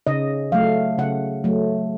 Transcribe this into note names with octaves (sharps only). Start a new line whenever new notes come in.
C#3 D#5
F#3 A3 F5
C#3 F#5
F#3 A3